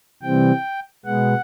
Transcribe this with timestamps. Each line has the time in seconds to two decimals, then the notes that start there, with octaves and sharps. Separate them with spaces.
0.22 C3 E3 G3 C4 G5
1.05 B2 G#3 B3 F#5